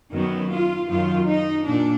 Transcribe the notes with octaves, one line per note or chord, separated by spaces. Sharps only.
F#2 D#3 F#3 B3
F4
F#2 D#3 F#3 F4
D#4
A#2 D4